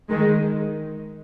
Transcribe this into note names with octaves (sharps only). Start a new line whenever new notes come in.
D#3 G#3